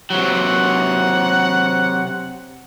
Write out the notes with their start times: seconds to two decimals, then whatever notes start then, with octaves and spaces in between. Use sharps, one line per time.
0.10 C3 F#3 F#5